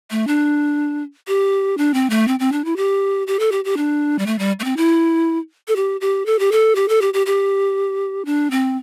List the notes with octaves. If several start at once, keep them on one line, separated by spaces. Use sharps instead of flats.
A3
D4
G4
D4
C4
A3
C4
C4
D4
E4
G4
G4
A4
G4
G4
D4
G3
A3
G3
A3
C4
E4
A4
G4
G4
A4
G4
A4
G4
A4
G4
G4
G4
D4
C4